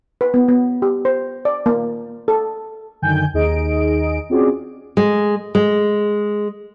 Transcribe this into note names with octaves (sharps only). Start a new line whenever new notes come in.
B4
B3
B3
G4
C5
D5
A#3
A4
F#2 D3 D#3 G5 G#5 G6
D#2 D#4 G#4 D#5 D7
C4 C#4 F4 F#4 G#4 D5
G#3
G#3